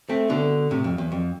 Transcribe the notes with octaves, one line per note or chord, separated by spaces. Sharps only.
A3 C4
B2 D3
A2 C3
F2
E2
F2